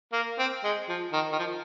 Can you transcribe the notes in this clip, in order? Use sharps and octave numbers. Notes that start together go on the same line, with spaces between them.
A#3
C4
G#3
F3
D#3
D#3
F3